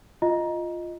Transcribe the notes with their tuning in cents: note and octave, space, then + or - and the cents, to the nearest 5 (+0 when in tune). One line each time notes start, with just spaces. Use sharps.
F4 +0 D#5 +0